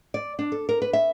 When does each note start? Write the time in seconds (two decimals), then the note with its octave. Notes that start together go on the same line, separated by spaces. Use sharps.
0.14 D5
0.39 D4
0.52 A4
0.69 A#4
0.82 B4
0.93 E5